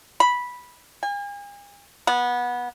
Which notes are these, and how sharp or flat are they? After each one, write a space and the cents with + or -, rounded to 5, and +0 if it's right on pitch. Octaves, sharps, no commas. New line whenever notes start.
B5 -10
G#5 -40
B3 -20